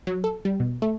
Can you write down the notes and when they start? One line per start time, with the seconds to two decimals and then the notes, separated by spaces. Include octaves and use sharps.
0.07 F#3
0.24 A4
0.45 G3
0.60 B2
0.82 A3